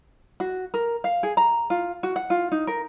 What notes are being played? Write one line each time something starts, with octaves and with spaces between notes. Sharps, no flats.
F#4
A#4
F5
G#4
A#5
F4
F#4
F#5
F4
D#4
A#4